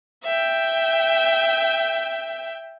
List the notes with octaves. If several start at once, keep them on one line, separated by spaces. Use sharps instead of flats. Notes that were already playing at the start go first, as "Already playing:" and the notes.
E5 G5